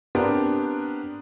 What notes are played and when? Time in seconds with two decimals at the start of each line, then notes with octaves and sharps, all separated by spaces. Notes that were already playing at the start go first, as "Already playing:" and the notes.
0.15 B3 C4 D4 G4 A#4